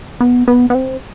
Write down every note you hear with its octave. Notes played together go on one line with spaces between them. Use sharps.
B3
B3
B3
C4